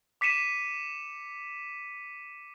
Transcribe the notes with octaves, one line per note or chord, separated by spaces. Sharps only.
D6 B6 C#7 D#7 E7